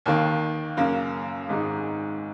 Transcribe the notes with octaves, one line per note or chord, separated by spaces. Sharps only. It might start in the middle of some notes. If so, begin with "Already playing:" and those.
D#2 D#3 A#3
F#2 C#3 A#3
G#1 G#2 G#3 D#4